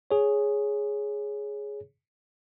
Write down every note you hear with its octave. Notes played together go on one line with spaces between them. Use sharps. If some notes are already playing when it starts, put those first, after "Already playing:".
G#4 C#5